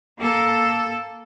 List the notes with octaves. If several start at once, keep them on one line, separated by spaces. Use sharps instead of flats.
A#3 A4